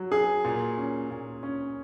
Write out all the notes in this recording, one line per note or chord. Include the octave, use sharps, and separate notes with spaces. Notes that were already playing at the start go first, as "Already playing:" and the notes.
Already playing: F#3
G#4
A#2
C#4
A#2
C#4